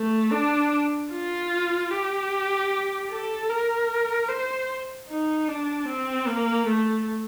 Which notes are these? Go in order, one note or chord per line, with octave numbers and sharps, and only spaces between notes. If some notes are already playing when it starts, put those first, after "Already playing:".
Already playing: A3
D4
F4
G4
A4
A#4
C5
D#4
D4
C4
A#3
A3